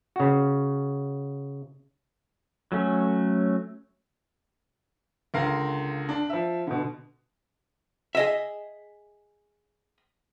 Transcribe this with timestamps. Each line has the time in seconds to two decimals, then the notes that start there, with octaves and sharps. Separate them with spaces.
0.16 C#3 F#4
2.72 F#3 A3 C#4
5.34 C#2 D3 A#4 F5
6.09 D4
6.30 F3 E5
6.67 B2 D3
8.15 G#4 D#5 E5